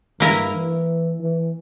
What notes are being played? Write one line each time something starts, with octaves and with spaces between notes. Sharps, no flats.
G2 A#3 E4 A#4
E3
E3